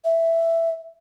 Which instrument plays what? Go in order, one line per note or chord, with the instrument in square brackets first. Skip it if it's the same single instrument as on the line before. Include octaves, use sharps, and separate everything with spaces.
[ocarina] E5